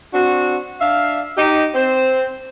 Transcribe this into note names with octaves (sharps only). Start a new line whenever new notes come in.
C4 D4 F#4
D4 E5 F5
D#4 G4
C4 C5